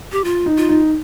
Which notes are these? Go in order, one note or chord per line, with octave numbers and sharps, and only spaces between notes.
G4
F4
D#4
F4
D#4